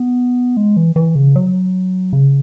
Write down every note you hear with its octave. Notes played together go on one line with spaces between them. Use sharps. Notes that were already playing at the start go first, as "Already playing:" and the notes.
Already playing: B3
G#3
E3
E3
C#3
F#3
C#3